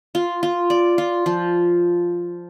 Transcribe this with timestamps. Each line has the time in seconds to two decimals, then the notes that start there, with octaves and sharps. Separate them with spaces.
0.15 F4
0.43 F4
0.70 D5
0.98 F4
1.26 F3